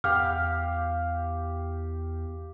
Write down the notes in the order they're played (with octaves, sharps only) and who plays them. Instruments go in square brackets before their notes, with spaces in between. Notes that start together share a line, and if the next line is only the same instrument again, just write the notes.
[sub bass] E2 [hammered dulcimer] G4 F5 [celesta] F6